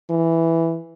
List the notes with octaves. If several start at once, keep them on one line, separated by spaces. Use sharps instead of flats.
E3